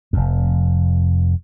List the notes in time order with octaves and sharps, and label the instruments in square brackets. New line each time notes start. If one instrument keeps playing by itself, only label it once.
[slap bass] F1 F2